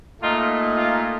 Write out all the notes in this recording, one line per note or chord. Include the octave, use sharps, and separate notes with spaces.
A#2 A3 D#4 F4
F4